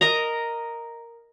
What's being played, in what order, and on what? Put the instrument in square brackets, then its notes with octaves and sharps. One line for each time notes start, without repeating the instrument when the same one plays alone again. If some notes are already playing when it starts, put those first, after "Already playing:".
[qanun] A#4 D#5 A#5